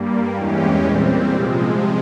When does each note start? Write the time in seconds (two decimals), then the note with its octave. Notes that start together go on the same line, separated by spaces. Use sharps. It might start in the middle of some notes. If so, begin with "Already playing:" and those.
Already playing: G2 G3 A#3
0.35 E2 E3 G#3 C#4 G4
0.84 A#2 G3 C4
1.34 C3 F3 G#3